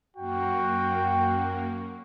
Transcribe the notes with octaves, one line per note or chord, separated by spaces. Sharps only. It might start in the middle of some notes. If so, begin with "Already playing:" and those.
F#2 A#3 F#4 G5